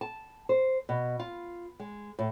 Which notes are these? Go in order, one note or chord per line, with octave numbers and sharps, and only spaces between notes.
A5
C5
B2
F4
G#3
A2